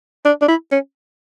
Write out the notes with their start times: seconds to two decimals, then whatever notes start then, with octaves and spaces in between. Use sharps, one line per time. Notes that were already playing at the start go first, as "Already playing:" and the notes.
0.25 D4
0.41 D4
0.48 E4
0.71 C#4